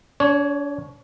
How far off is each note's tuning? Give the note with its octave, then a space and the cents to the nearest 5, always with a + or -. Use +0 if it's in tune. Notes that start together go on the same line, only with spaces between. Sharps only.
D4 -40 C#5 +0